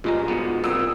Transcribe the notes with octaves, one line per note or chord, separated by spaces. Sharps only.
G2 A#2 G#3 A#5
G#2 B2 B3
C2 A#2 D#6 E6